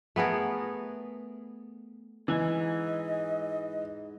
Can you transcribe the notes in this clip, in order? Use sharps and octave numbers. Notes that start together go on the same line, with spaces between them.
A3 B3 G#4 A#4
G#2 E3 D#5 G#5